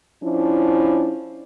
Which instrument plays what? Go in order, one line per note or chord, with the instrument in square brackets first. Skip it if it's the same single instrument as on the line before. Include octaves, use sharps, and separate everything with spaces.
[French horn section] F3 C#4 D4 E4